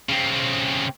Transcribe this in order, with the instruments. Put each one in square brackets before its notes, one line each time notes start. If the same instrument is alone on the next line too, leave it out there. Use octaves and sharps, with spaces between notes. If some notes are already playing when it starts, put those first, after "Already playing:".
[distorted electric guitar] C#3 C4